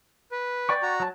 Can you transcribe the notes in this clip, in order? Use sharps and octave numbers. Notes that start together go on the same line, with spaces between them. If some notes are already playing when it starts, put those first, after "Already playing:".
B4
D5 G5 C#6
F#4 A#5
F#3 A5